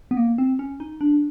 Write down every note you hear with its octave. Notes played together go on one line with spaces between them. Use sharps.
B3
A#3
C4
C#4
D#4
D4